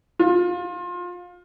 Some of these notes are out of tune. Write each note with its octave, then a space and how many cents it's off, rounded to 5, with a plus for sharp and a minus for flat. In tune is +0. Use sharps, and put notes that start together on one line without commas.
F4 +25